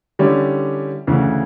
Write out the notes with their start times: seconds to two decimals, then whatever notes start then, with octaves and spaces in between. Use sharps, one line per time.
0.19 D3 G3 C#4 E4
1.07 D2 C#3 E3